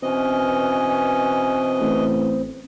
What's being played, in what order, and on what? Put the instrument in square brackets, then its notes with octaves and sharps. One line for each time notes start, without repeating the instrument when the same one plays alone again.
[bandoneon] B2 E3 D#5 [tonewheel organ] C4 [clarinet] C#4
[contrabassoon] A1